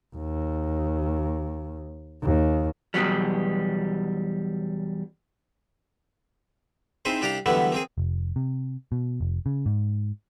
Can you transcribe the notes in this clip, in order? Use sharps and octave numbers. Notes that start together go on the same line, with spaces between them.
D#2
D#2
E2 B2 D3 F#3 G3
C4 D#4 E4 G#4 C5
C2 D4 G4 D5 F5 A#5
D3 E3 F#3 G3 A3 B3
A#3 C4 G#4
F1
C3
B2
F1
C#3
G#2